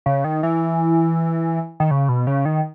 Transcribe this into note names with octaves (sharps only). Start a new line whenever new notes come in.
C#3
D#3
E3
D#3
C#3
B2
C#3
D#3